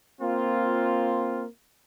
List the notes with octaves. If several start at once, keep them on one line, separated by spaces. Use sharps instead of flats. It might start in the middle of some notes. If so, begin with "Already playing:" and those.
A#3 C4 F4